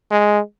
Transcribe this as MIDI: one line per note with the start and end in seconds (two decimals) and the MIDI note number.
0.11 0.39 56